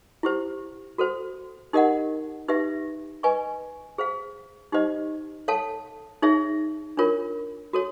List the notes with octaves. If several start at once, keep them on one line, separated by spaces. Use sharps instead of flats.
E4 G4 C5
F#4 A4 C5
D#4 G4 A#4 D#5 F#5
D#4 G4 B4 E5
B4 D#5 G#5 C#6
G#4 C5 F5
D#4 G4 C5 D#5
A4 C#5 F5 A5
D#4 G#4 C#5 E5
D4 F4 A#4 C#5
F#4 A4 C#5